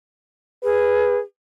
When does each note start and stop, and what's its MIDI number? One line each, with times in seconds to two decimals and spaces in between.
0.64 1.17 68
0.64 1.19 71